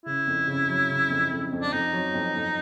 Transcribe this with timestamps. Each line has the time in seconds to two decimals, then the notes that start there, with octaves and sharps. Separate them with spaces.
0.06 C#3 E4
0.27 F2
0.47 C#3
0.68 F#3
0.90 C#3
1.10 F2
1.31 F2
1.52 F2
1.62 D4
1.72 F2 D#4
1.93 F#3
2.14 F2
2.35 F2